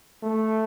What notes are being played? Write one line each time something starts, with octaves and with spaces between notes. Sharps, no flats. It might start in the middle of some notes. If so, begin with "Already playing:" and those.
A3